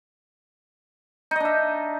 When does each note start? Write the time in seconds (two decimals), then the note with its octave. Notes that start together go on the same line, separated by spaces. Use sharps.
1.31 D#4
1.36 D#5
1.40 D4
1.45 E5